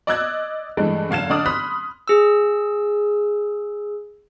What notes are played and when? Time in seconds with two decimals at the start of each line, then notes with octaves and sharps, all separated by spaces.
0.07 D5 D#5 E6 F#6 G#6
0.77 G2 E3 G#3 A3
1.10 F#1 D3 F5 G#6 E7
1.30 D3 D4 D#4 D5 D#6 F6
1.46 B5 C6 D#6 F6 F#6 B6
2.08 G#4 E6